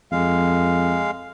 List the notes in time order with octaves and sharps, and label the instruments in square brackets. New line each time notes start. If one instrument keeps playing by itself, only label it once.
[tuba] F2 [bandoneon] G#3 F5